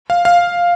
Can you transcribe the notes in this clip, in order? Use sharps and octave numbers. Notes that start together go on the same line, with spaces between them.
F5
F5